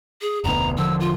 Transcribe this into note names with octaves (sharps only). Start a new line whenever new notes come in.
G#4
F1 D2 B2 A#5
E1 D3 F3 E6
F4